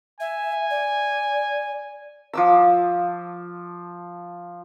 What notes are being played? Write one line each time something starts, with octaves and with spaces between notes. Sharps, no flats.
E5 G#5
D5
F3 D6 E6